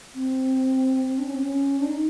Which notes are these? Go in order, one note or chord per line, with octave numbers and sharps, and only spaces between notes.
C4
D4
C#4
C4
C#4
D4
D#4